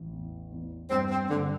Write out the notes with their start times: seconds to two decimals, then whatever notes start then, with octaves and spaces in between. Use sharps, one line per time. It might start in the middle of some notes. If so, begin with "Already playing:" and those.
Already playing: A1
0.13 E2
0.52 E2
0.90 G2 C4
1.10 C4
1.30 G2 D3